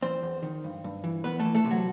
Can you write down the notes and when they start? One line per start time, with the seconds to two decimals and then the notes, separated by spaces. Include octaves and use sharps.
0.02 E2 C4 C5
0.23 E2
0.42 D#3
0.64 G2
0.84 G2
1.04 E3
1.24 E2 B3 B4
1.39 A3 A4
1.45 E3
1.55 A3 A4
1.64 C3
1.71 F#3 F#4